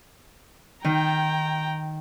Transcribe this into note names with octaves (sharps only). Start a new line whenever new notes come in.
D#3 G5 A#5